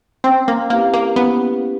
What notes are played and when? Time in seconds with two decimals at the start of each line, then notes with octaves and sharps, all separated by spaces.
0.24 C4 C#4
0.48 A#3
0.70 A#3 E4 G4 B4
0.94 A#3
1.16 B3 C#4
1.62 B4